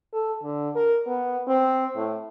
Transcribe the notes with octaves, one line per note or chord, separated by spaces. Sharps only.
A4
D3
A#4
B3
C4
A2